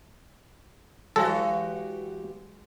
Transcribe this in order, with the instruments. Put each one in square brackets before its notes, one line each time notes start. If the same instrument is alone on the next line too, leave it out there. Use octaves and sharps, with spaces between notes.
[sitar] E3 F#4 G4 [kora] F#3 G#3 [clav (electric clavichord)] A4